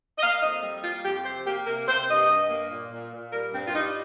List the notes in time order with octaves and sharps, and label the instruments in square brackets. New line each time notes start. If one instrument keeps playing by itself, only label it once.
[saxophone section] D#5
A#3 F5
F2 D#5
G3
A#3 F4
F2 G4
C3 C5
A#3 G4
C3 A#4
C3 C5
G2 D#5
G2
A#3
A#2
A#2
A#2
G3 A#4
G2 C4
F4
G3 D#4